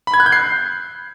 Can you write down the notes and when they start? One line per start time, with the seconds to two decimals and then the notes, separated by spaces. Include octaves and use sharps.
0.07 B5
0.14 G#6
0.20 F#6
0.26 G6
0.32 C7